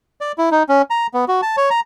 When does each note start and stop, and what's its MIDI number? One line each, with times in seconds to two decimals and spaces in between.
0.21 0.32 74
0.38 0.49 64
0.51 0.63 63
0.69 0.82 61
0.90 1.07 82
1.14 1.25 59
1.28 1.41 66
1.42 1.56 81
1.57 1.70 73
1.70 1.80 82